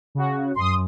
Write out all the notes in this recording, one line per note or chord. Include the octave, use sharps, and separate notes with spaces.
C#3 F#4
F#2 C6 D#6